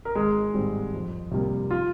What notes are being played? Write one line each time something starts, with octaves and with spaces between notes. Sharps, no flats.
A#4
G#1 G#3 G#4
G#2 D#3 G3 C4
F2
C3 G3 A#3
F4